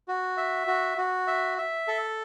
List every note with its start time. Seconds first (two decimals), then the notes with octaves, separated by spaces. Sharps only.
0.08 F#4
0.37 E5
0.67 F#4
0.98 F#4
1.27 E5
1.58 E5
1.88 A4